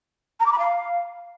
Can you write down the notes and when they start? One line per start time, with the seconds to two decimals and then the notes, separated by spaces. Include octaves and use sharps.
0.40 A#5
0.46 D6
0.52 B5
0.59 F5